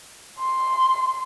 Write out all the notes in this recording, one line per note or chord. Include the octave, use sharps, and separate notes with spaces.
C6